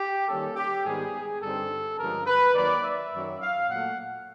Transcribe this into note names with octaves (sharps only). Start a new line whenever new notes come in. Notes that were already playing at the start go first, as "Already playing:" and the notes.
Already playing: G4
D#3 G3 A#3 C#4 A4
G4
G#2 D#3 G3 B3 G#4
G2 D3 G3 C4 D#4 A4
G2 D3 F3 G#3 C#4 A#4
B4
D#3 F#3 A#3 D5
E5
F#2 D#3 F#3
F5
A#2 F#3 A3 F#5